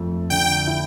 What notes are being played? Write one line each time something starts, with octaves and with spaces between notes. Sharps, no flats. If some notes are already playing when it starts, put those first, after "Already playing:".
Already playing: F2 A3
D3 G5
E4